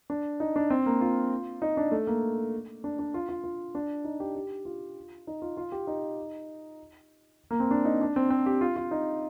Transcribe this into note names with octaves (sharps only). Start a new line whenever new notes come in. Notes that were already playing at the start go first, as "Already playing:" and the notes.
D4
D#4
D4
C4
A#3
F4
D#4
D4
A3
A#3
D4
D4
F4
F4
F4
D4
D#4
G4
G4
F4
D#4
F4
F4
G4
D#4
A#3
C4
D4
D#4
D4
C4
C4
G4
F4
F4
D#4